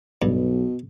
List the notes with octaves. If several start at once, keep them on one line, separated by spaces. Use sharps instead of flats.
B1 G2 B2